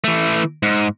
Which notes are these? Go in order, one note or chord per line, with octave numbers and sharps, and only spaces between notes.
E3 A3
G#2